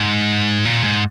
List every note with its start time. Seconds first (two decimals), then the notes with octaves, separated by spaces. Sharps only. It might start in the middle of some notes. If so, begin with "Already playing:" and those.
Already playing: G#2
0.65 A#2
0.84 G#2